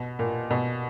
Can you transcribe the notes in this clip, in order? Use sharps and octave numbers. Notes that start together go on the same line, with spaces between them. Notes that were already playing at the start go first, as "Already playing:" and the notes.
Already playing: B2
A#2
B2